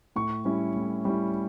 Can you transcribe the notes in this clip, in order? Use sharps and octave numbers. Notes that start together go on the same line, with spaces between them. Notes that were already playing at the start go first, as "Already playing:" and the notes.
A2 C#6
G3 C#4 E4
A2
G3 C#4 E4